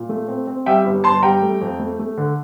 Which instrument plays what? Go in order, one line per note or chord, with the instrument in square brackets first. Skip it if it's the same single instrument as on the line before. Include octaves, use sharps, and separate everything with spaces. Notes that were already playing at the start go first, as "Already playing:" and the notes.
Already playing: [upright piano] A#2
A3
C4
C4
G3 E5 G5
G1
G1 A5 C6
G3 G5 A#5
A3
F2
A3
A3
D3